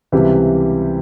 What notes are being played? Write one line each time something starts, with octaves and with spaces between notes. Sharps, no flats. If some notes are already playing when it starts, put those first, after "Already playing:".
C#2 C3 E3 G3 C4 G4